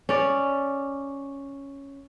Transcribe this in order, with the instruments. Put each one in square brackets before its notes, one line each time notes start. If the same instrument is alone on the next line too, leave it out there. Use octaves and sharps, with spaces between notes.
[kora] C#4 D5